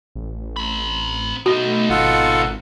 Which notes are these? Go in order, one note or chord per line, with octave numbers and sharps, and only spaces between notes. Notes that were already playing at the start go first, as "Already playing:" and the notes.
A1
C4 B5
B2 A3 D#4 F#4
G#1 F4 A4 F#5